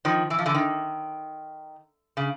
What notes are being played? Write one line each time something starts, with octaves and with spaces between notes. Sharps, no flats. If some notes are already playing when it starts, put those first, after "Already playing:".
D#3 F3
E3
F3
D3 E3
D#3
C#3